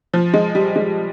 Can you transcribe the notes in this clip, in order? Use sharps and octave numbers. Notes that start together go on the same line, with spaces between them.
F3
G#3
G3
G#3